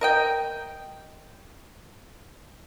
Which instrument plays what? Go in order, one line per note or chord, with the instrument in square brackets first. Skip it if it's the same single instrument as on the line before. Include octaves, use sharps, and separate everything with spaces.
[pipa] A#4 D#5 G5